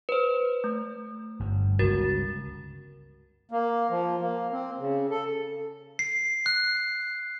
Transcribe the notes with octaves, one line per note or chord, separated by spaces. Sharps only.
B4 C5
A3
G1 G2
G1 C#2 F#4 A#4 A6
A#3
F3
A#3
C4
C#3
A4
C7
F#6